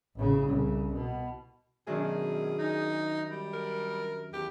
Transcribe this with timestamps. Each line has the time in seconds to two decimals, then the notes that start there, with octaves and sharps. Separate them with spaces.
0.16 A1 C#3
0.48 C2 C#3
0.93 B2
1.87 F#2 B2 D#3 D4 G#4
2.58 D#4
3.29 G3
3.53 A#4
4.33 E2 G4